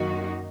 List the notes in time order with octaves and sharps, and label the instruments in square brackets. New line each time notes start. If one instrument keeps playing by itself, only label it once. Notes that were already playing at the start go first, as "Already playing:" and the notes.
Already playing: [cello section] F#2 D#3 A#3 D#4 F#4